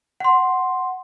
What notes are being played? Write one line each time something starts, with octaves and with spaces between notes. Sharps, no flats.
F#5 C6